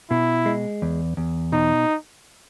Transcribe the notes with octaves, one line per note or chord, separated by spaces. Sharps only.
B2 E4
G#3
E2
E2
B2 D#4